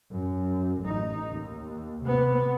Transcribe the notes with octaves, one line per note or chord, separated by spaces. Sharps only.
F#2
A1 D#4
D#2
C3 B3